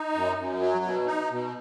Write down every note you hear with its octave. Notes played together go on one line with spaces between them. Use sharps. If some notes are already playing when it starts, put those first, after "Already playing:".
Already playing: D#4
F#2
F#2
F#3
B2
D#4
B2